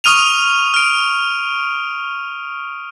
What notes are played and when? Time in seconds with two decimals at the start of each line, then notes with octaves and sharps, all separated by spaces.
0.04 C#6 D#6 F6 D#7 F7
0.74 F6 D7